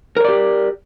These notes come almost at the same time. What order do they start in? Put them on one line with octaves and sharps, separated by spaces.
A#4 C#5 D5 G4